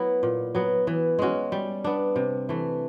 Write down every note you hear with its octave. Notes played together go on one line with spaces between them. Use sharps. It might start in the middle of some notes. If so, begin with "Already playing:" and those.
Already playing: F#3 A3 B3 E4
A#2
F#3 B3
E3
G#3 C#4 F#4
G3
B3 D4
C3
E3 A3